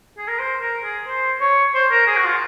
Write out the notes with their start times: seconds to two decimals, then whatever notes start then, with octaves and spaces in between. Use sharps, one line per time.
0.18 G#4
0.28 A#4
0.39 C5
0.61 A#4
0.84 G#4
1.07 C5
1.41 C#5
1.74 C5
1.91 A#4
2.07 G#4
2.17 F#4
2.25 F4